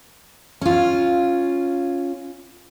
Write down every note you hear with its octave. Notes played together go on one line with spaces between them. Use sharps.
C#4 F4